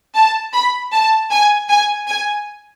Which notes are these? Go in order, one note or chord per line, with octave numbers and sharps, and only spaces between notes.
A5
B5
A5
G#5
G#5
G#5